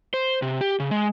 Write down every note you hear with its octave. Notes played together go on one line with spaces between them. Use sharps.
C5
C3
G4
C#3
G#3